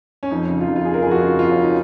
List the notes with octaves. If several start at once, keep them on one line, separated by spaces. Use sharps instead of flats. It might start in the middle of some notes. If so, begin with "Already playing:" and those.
C#4
F2 D#4
C#3
F4
F2 D#4
F4
C#3 G#4
A#4
F2 G#4
F#4
C#3 F4
F2 F4
C#4
C#3
D#4